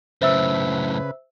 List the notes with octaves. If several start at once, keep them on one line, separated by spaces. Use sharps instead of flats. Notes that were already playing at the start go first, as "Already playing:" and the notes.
F#2 A2 C#3 B4 C5 E5 E6